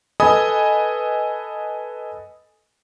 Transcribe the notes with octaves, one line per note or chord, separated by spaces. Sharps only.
A4 B4 D#5 G#5 B5 D#6